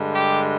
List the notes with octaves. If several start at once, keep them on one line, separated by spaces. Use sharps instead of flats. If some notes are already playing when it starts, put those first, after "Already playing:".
Already playing: G2 D3 G#3
G4